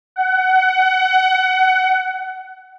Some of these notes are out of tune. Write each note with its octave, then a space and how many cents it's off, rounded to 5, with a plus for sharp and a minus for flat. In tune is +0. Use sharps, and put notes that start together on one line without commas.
F#5 +25